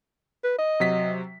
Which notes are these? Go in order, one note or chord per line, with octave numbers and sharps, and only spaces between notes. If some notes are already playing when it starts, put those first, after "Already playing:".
B4
D#5
C3 F#3 B6